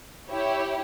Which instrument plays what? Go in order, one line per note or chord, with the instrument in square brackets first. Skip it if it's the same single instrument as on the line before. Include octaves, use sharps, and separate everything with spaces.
[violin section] E4 G4 C#5